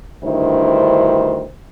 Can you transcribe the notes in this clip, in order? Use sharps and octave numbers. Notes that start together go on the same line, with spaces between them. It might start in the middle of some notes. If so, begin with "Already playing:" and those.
D2 G2 D#3 E4 C5